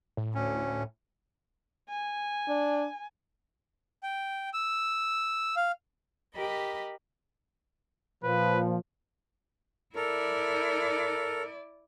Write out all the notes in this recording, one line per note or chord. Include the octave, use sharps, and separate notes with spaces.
A2
D2 C#4
G#5
D4
G5
E6
F5
G4 A#4 D#5 B5
A#2 F3 B4
E4 A4 A#4 D5